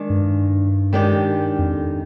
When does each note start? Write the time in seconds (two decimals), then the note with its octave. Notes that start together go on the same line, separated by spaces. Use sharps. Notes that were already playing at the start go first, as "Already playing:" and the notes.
Already playing: D#3 G#3 D4
0.10 G2
0.93 D#3 G#3 D4 G4
1.59 F2